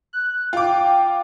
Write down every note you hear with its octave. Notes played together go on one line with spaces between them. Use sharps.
F#6
F4 G5 D6